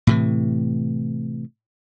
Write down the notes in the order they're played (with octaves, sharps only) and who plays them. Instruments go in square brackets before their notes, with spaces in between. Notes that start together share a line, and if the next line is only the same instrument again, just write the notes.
[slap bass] A2 C3 E3